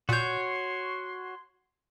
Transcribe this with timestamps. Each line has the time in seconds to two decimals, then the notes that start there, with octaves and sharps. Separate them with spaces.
0.09 A#2 F#4 C#5 C6 G6